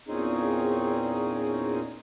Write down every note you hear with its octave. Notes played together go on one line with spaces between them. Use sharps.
E2 A#2 C4 C#4 D#4 G#4